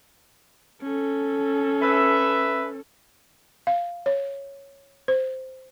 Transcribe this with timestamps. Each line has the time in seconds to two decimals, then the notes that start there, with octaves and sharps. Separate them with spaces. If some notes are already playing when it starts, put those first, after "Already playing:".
0.82 C#4 A4
1.82 B4 E5
3.67 F5
4.06 C#5
5.08 C5